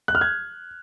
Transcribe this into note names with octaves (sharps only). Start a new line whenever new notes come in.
F#6
F6
G#6